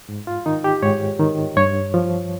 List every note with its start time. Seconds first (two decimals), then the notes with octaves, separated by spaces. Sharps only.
0.09 G#2
0.27 F4
0.46 D#3 D#4
0.64 G4
0.83 G#2 C#5
1.20 D#3
1.57 G2 C#5
1.94 F3